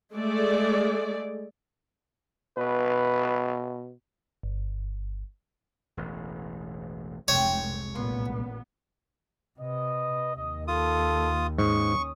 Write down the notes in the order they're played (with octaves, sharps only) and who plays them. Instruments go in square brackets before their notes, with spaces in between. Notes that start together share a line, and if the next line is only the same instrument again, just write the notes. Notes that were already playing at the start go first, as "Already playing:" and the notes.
[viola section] G#3 A3 G#4 D5
[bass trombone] B2 [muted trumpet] B4
[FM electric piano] G1
[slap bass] E1 A1
[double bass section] F1 [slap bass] C2 G#3 [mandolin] C5 G5 [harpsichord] C#5
[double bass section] A1 A#2 B3 [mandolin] C6
[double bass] C3 [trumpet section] B4 D#5
[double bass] D#2 [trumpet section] D#5
[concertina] F4 D#6 [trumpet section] A4
[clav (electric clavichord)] G#2 [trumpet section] C#4 C#5 D#6 [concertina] C#6